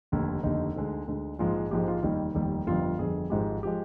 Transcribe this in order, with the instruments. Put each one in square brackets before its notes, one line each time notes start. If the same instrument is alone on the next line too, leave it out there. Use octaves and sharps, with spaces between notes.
[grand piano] F1 D#2 D3
F1 D#2 D3 D#4
D2 D3 G#3
D2 D3 G#3
A#1 G#2 F3 G#3 F4
G#4
A#1 G#2 F3 G#3 G4
F4
F1 D#2 D#3 G3 D#4
F1 D#2 D#3 G3
G1 F2 D3 G3 F4
G1 F2 D3 G3 G#4
G#1 G#2 F3 G#3 G4
F3 G#3 G4